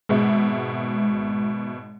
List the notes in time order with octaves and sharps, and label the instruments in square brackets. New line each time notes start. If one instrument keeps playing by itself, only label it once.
[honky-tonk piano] G#1 B2 E5 [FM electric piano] G#3